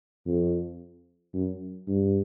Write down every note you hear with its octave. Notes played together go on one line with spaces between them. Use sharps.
F2
F#2
G2